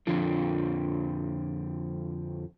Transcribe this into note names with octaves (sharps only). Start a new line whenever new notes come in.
F2 D3 F3